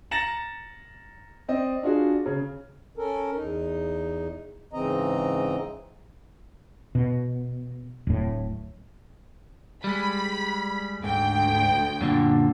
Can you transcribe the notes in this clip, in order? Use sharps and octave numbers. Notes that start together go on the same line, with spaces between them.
A#5 A6 A#6 C#7 E7 F#7
C4 D5 D#5
D4 F4 F#4 G#4
C#3
C#4 A4 A#4
E2 D#4
G#2 C#3 E3 C4 D#5 A#5
B2
D1 A2
G3 G#3 B5
D2 G#2 G5
F#2 A#2 D3